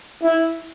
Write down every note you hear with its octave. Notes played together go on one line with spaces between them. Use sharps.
E4